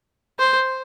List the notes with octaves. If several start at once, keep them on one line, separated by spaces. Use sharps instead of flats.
C5